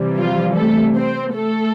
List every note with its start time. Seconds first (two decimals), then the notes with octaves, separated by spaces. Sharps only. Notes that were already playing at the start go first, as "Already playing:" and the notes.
Already playing: C3 E3 G3
0.17 F3 F4
0.56 A3 A4
0.96 C4 C5
1.35 A3 A4